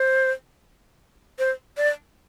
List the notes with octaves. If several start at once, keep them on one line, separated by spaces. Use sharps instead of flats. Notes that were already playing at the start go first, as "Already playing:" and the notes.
Already playing: C5
C5
D5